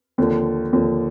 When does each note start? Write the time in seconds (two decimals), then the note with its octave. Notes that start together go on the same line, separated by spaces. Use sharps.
0.18 D#2 D3 F3
0.73 D#2 D3 F3